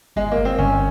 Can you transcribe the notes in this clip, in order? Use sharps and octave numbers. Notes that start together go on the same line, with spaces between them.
G1 G#3
A#3
G1
C4
G1 C#4